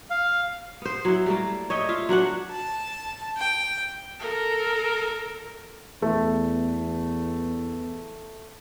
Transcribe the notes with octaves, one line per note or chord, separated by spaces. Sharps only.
F5
B3 C5
F#3 E4
G3 A3 A#3
C#5 D#5 E5 G5
F4 E5
F#3 D4 F#4 F#5
A5
G5
A4 A#4
E2 A3